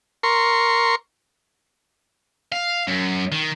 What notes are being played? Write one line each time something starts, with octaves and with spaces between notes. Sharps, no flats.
A#4 C6 C#6
F5
F#2
D#3